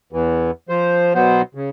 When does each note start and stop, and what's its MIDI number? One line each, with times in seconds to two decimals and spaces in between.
0.12 0.51 40
0.12 0.51 52
0.69 1.13 53
0.69 1.13 72
1.15 1.42 47
1.15 1.42 54
1.15 1.42 59
1.15 1.42 72
1.55 1.70 49